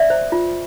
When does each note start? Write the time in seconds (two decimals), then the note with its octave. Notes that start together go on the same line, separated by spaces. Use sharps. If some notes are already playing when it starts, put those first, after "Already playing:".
Already playing: D5 E5
0.10 C5
0.32 F4